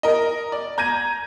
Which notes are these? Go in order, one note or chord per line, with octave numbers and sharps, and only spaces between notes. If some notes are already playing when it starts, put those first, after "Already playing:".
A#4 D#5
D5
A#5 G6 G#6 A#6 D#7